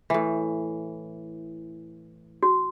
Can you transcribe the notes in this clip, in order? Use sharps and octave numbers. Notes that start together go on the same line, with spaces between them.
A2 E3
F#4